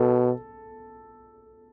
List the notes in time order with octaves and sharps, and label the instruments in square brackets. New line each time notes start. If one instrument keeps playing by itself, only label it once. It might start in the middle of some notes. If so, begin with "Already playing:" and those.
Already playing: [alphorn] B2 [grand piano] A4